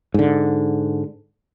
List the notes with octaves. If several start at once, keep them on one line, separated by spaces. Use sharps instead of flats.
G#2 D3